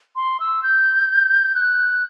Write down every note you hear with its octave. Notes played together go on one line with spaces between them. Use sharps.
C6
E6
G6
F#6